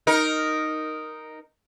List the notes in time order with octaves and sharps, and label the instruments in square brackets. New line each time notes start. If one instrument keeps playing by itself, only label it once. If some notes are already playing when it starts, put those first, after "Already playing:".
[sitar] D#4 A#4